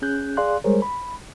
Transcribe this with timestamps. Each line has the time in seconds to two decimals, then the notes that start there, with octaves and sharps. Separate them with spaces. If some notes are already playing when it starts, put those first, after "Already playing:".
0.02 C#4 G#4 F#6 G6
0.37 G#4 D5 F5 C6 F#6
0.64 G3 G#3 G#4 A#4 C5 C#5
0.82 B5